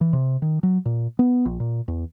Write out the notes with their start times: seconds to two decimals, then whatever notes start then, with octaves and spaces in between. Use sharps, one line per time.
0.01 E3
0.13 C3
0.42 D#3
0.63 F#3
0.85 A#2
1.19 B3
1.45 A#1
1.60 A#2
1.88 E2